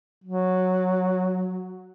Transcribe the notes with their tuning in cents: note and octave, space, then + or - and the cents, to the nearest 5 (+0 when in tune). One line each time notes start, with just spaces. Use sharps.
F#3 -5